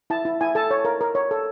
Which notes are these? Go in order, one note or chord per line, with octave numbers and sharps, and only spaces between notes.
E4 A5
E4
E4 G#5
A4 A5
C#5
A#4
A#4
C#5
A4